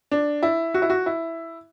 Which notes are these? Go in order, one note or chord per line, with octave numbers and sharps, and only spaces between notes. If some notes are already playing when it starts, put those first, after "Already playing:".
D4
E4
F#4
E4
F#4
E4